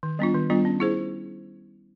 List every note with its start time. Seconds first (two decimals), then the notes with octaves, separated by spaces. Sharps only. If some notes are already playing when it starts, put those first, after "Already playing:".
0.03 D#3
0.19 G3 B3 D4 F4
0.34 D#3
0.50 G3 B3 D4 F4
0.65 C#4
0.80 E4 G#4 C5